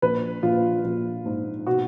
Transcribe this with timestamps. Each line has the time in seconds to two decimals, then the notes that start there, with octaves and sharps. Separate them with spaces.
0.02 A#1 B4
0.43 A#1 F4
0.84 A#1
1.26 G#2
1.67 B2 F#4